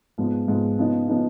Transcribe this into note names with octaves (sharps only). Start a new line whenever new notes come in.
G#2 F3 B3
G#2 F3 B3
C#3 F3 B3 D#4
C#3 F3 B3 D#4